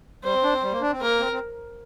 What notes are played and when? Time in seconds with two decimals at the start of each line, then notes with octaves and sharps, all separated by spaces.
0.23 G3 C5
0.34 C4
0.43 D4
0.53 C4
0.63 G3
0.72 A#3
0.81 D4
0.92 C4
1.01 A#3 A#4
1.20 C4
1.32 C4